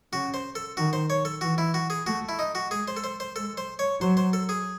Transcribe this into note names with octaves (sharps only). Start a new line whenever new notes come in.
C#3 F#4
C5
A4
D#3 F#4
C5
C#5
A4
E3 F#4
E4
F#4
G#4
A3 F#4
E4
D#4
F#4
G#3 G#4
C5
A4
C5
C5
G#3 A4
C5
C#5
F#3 C5
C5
A4
G#4